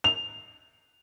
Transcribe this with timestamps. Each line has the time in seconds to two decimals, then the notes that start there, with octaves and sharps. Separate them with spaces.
0.04 F7